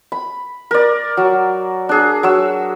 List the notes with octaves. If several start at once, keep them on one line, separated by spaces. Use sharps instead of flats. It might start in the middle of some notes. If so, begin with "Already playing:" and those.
B5
A#4 D5
F#3
D4 G#4
F#3 E6